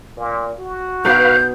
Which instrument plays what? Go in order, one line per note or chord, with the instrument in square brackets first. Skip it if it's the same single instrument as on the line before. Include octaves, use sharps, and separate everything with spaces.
[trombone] A#2
F#4
[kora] B2 D#4 D5 [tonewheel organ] B4 F5 [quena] G6